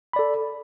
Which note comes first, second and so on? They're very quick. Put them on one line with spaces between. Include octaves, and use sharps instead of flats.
B5 D5 A4